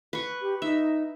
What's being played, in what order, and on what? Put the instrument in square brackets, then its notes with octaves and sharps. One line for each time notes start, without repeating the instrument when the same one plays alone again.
[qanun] B4 C#6
[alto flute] G4
[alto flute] D#4 [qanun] E5